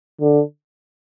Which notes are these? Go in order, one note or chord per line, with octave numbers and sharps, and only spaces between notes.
D3